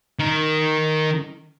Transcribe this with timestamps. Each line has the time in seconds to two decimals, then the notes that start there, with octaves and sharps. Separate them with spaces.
0.19 D#3 A#4